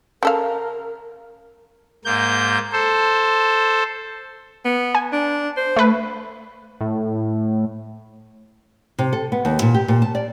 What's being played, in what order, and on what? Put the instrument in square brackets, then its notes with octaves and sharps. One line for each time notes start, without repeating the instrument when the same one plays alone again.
[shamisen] C#3 A4 F5 [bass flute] A#4
[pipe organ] G#2 A#3 G6
A4 C5
[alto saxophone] B3
[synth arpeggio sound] G#5
[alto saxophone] D4
C5
[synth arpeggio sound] A3 B4
[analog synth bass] A2
[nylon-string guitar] C3
A4
B3
D#2
A#2
G4
A#2
A5
D5